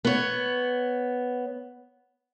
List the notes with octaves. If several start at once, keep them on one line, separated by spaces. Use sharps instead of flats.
B3 C#5